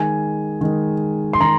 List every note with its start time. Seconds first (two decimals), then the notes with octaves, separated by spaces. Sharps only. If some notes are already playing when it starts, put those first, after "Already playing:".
Already playing: D#3 G#3 G#5
0.61 D#3 G#3
1.33 C6
1.40 D#3 G#3 A#5